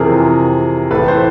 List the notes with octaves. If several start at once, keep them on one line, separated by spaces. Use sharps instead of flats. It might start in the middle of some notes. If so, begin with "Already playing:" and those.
Already playing: F2 C3 E3 G#4 A#4
A2 E3 A4 B4
C5